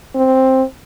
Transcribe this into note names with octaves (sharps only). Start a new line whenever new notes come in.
C4